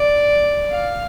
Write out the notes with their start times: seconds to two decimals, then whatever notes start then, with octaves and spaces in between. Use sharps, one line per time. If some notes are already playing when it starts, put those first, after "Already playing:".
Already playing: D5
0.71 F5